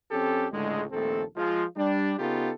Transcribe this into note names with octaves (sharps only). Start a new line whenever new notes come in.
F2 C4 C#4 G4 A4
C#2 A2 D3 G#3
A#1 D#2 A3 C4 A4
F3 G#3 F4
G3 D4
C#3 B3 D#4 F4 G4 A4